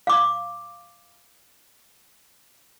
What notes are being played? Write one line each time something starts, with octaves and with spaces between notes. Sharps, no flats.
F5 D6